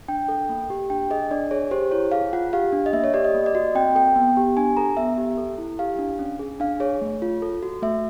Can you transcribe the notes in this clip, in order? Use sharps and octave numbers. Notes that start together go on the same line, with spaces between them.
D4 G5
A4
A#3
G4
D4 G5
G#4 D#5
D4 D5
G#4 C#5
G4 C5
E4 C#5
G#4 F5
F4 F#5
G4 F5
D4
D#5
A#3 E5
C#5
G4 D5
D#5
A#3
D5
F#4 D#5
C4 G5
A4 G5
B3
G4
D4 G#5
A4 A#5
B3 E5
G4
A4
E4
G4 F5
D4
C#4
G#4
D4 F5
G#4 C#5
A3
F4
A4
F#4
A3 E5